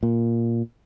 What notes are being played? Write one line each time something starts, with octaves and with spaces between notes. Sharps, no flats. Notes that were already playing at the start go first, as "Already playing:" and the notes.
A#2